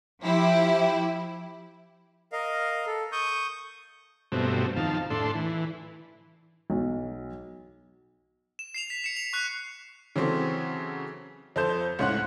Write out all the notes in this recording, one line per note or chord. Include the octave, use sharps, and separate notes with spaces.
F3 E4 G4
A#4 D#5 F5
A4
C#6 D#6 G6
G2 B2 F#3 A3 C4
F2 D#3 F5 A5
A2 D4 A4 C6
E3
B1
E7
C7 E7 F7
B6
C#7 E7
F7
C#6 F#6 C7
C#3 E3 F#3 C4 A4 C#5
F2 A4 C5 G6 E7
C#2 A2 C#4 F#5 C6 F#6